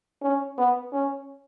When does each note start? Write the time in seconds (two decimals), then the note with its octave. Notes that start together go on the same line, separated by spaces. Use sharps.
0.22 C#4
0.58 B3
0.93 C#4